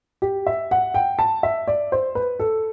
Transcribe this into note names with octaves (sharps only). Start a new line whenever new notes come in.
G4
E5
F#5
G5
A5
E5
D5
C5
B4
A4